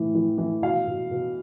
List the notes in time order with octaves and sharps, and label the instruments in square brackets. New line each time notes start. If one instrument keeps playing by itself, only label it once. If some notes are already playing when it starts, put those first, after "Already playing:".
Already playing: [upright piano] A2 E3
E3
E3
B2 F5
B2
B2